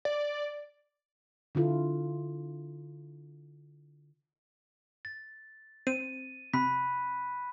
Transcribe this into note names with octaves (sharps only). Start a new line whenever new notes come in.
D5
D3 E4 F4 A4
A6
C4 D#7
C3 B5 F#6 B6